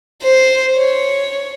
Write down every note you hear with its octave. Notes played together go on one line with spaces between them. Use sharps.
C5
C#5